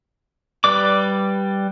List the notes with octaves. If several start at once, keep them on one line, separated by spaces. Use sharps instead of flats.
G3 B4 D5 D6